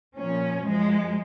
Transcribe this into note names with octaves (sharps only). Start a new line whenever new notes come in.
A#2 F3 C#4
F#2 F3 G#3